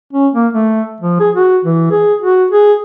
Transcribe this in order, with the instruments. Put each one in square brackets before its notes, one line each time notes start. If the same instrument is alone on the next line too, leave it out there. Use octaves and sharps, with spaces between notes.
[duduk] C#4
A#3
A3
F3
G#4
F#4
E3
G#4
F#4
G#4